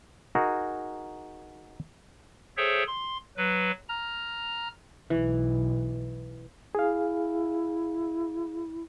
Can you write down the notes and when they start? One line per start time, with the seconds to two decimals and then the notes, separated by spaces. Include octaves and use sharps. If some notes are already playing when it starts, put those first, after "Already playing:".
0.35 D#4 F#4 G#4 A#4
2.57 G#4 A4 C5 C#5 E5 G5
2.87 C6
3.37 F#3 B4
3.89 A#5 F6
5.10 B1 E3
6.75 E4 G#4 F5